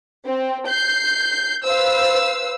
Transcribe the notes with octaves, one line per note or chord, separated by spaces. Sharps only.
C4
G6 C7
B4 C5 F5 E6